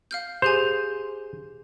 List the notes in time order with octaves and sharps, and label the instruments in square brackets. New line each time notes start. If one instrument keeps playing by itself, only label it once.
[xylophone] F5 F6 G6
[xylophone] G4 G#4 G#5 [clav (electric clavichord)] C5